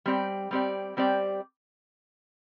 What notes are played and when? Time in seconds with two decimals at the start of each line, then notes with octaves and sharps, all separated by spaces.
0.06 G3 C4 G4 D5
0.51 G3 C4 G4 D5
0.97 G3 C4 G4 D5